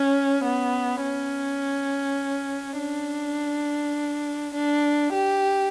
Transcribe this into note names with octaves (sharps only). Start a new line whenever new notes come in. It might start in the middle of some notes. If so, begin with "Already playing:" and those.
Already playing: C#4
B3
C#4
D4
D4
G4